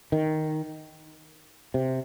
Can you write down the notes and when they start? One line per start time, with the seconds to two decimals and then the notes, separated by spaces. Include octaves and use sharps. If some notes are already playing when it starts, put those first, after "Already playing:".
0.12 D#3
1.74 C3